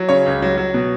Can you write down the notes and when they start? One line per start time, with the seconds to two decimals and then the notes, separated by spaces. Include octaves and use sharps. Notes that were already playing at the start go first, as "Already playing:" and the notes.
Already playing: F#3
0.09 C#3 C#5
0.26 C#2
0.42 F#3
0.58 F#3
0.74 B2